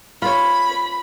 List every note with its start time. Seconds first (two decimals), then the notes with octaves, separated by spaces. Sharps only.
0.22 F4 C#5 B5